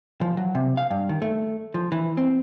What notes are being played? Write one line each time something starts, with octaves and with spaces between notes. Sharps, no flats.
F3
F#3
C3
F5
G2
D#3
A3
F3
E3
C4